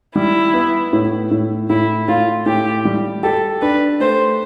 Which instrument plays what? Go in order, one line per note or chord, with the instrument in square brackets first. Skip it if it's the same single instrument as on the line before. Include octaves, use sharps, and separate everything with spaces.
[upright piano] G3 [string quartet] E4
[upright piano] B3
A2
A2
[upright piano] A2 [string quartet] E4
[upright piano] A2 [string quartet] F4
[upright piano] A2 [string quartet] G4
[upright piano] G3
[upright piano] G4 [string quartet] A4
[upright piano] D4 [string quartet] B4
[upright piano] A3 [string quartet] C5